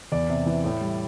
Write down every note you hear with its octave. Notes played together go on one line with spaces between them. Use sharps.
E2 D5
C3
E3
A2
G3